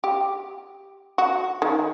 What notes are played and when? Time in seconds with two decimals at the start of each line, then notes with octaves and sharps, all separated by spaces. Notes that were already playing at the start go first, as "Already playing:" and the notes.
0.04 G4
1.18 F#4
1.62 D#3